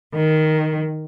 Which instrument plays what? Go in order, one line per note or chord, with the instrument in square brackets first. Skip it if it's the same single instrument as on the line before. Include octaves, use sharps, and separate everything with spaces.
[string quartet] D#3